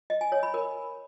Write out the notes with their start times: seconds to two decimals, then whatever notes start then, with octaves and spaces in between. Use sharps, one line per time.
0.10 D#5
0.21 G#5
0.32 C#5
0.43 B5
0.54 A#4